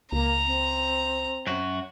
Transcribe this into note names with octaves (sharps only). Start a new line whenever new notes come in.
C#2 A#3 A#5
C4
F#2 F#4